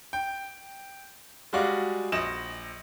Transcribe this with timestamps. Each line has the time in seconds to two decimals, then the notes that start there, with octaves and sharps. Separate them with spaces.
0.13 G5
1.53 G3 G#3 F#4 D5 F5
2.12 A#1 D#5 E7